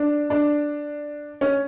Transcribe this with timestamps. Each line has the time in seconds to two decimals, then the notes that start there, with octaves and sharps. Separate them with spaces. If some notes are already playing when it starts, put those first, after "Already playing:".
Already playing: D4
0.30 D4
1.41 C#4